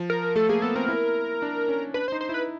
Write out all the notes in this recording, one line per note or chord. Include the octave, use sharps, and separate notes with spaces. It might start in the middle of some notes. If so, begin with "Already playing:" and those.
Already playing: F3
A#4
A3 A4
A#3 G#4
B3 A4
C4 A#4
E4
D4
C#4
D4 B4
C5
D#4
C5
E4
B4